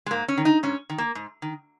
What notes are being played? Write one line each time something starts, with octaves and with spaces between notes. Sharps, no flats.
G#3
G#2 A#3
C#4
D#3
D#4
G#2 C#4
D#3
A#3
G#2
D#3